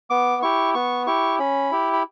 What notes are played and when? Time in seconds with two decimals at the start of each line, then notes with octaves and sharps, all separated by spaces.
0.10 B3 D6
0.42 E4 G4 C#6
0.74 B3 C#6
1.07 E4 G4 C#6
1.39 C#4 B5
1.71 E4 G4
1.93 B5